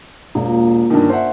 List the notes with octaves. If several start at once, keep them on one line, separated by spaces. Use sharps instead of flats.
E1 A#2 A#3
G2 D3 D#3 C#4 D4
C5 E5 F#5